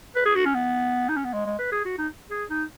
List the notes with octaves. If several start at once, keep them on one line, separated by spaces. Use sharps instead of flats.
B4
G#4
F#4
C#4
B3
D#4
C#4
B3
G#3
G#3
B4
G#4
F#4
D#4
G#4
D#4